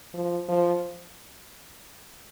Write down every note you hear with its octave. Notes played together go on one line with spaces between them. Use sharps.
F3
F3